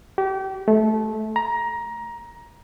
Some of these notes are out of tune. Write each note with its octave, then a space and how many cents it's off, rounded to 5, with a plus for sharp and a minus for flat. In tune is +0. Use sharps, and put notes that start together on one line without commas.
G4 -35
A3 -20
A#5 +20